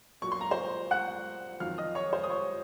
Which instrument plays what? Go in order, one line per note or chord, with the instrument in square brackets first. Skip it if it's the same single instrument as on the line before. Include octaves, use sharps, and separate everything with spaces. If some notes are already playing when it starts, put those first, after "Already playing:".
[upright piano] A#2 F#3 C#6
C6
A#5
C5 C6
F#5 F#6
F2 D#3 F#3 F5 F6
D#5 D#6
C#5 C#6
C5 C6
D#6
C#5 C#6